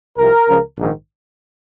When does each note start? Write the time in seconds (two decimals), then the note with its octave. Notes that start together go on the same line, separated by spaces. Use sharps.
0.17 C2 C3 F3 A#4
0.48 C#2 C#3 F3
0.78 A#1 G#2 D#3